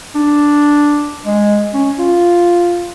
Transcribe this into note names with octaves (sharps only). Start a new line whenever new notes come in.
D4
G#3
C#4
F4